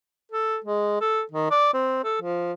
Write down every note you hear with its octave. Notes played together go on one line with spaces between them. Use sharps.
A4
G#3
A4
D#3
D5
C4
A4
F3